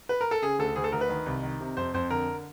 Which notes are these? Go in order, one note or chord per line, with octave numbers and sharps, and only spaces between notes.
B4
A#4
A4
C#3 G#4
D2 A4
D2 G#4
A4
D2 A#4
B4
D#3
C2
D#3
C3
F2 C5
F2 C5
D3 A#4